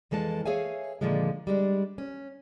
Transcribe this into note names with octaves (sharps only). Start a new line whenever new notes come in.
F2 E3 G#3 A4 A5
G#4 C#5 E5 F5 G#5
A#2 D3 D#3 F3 G#3
G3 G#3 D4
C#4